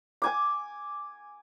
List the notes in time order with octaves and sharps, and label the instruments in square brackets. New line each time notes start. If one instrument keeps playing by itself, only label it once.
[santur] G#5 D6